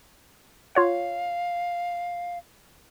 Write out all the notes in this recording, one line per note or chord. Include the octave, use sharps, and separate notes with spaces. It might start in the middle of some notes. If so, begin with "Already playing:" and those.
F4 C#5 F5 F#5